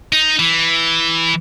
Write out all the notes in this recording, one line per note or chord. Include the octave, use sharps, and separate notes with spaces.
D#4
E3